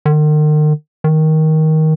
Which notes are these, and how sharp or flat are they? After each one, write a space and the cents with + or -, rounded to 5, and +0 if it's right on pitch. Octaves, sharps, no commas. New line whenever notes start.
D#3 -40
D#3 +15